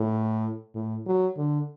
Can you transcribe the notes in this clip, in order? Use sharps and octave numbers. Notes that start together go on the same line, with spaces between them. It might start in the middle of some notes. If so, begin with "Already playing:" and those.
Already playing: A2
A2
F#3
D3